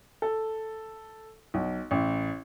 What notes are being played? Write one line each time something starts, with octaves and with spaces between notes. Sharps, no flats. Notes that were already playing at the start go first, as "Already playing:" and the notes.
A4
B1
A1